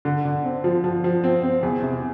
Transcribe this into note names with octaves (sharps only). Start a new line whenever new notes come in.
D3
D3
C4
F3
F3
F3
C4
C4
E2
C3